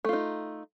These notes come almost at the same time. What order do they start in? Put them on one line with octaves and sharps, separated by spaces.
A3 F4 D#4